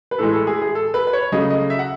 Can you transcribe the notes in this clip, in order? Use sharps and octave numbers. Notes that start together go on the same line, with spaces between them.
B4
A2 E3 G#3 A4
A4
G#4
G#4
A4
B4
B4
C#5
C#3 F#3 A3 D#5
D#5
E5
F#5